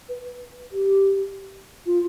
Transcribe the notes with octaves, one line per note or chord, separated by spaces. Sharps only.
B4
G4
F4